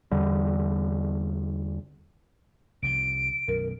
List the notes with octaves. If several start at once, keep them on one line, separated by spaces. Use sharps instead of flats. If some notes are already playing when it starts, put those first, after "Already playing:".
E2 D3 G3
C2 C3 F3 D7
B1 F#2 B2 A#4